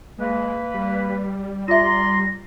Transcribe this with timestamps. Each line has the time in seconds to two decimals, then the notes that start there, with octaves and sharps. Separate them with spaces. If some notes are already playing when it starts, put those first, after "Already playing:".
0.19 G#3 A#3 B4
0.74 G3
1.68 F4 D5 E5 A#5 C6 A#6